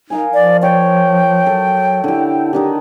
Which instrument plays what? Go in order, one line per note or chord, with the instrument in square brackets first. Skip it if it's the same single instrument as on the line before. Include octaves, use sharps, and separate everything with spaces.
[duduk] D#4 [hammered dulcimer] A#4 F5 G#5
[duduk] F3 [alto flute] D5
[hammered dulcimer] C#5 [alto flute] G5
[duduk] F#3 [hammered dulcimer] A4
[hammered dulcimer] D3 G4 [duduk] E4
[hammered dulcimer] D#3 D4 D#4 [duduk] G4